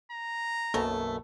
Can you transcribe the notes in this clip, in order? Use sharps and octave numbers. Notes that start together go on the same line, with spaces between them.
A#5
B1 F#2 B2 A3 A#3 A4 A#4